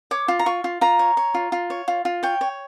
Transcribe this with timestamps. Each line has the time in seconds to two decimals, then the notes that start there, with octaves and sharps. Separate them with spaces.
0.11 C#5 D6
0.28 F4
0.39 A#5
0.46 F4 C#6
0.64 F4
0.81 F4 A#5
0.99 C#5
1.17 C#5
1.34 F4
1.52 F4
1.70 C#5
1.88 F4
2.05 F4
2.23 C#5 G5
2.41 C#5